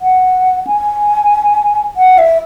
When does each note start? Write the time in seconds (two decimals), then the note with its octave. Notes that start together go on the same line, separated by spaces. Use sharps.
0.01 F#5
0.67 G#5
1.97 F#5
2.18 E5